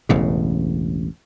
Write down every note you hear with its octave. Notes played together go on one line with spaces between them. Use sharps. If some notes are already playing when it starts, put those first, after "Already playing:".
E1 A1 C#3